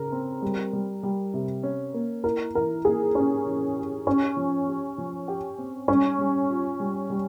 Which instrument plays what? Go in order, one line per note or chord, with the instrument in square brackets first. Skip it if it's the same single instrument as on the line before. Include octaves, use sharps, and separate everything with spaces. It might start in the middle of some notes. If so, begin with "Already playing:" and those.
Already playing: [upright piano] C#3 [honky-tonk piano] A#4
[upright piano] C4
G3
G3
G3
C3
C#4
A#3
[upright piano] E4 [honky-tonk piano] A#4
[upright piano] E3 [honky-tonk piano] A#4
[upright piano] A#3 [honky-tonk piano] G#4
[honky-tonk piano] C#4 [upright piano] G4
[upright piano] E3
G4
[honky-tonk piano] C#4 [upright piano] G4
[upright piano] F3
G4
F3
G4
C4
[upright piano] G3 [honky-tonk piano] C#4
[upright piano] G3
F4
G3
G3